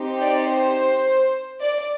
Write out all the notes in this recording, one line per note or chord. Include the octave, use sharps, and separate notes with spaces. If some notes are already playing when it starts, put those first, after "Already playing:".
Already playing: C4 D#4 G4
D5
C5
D5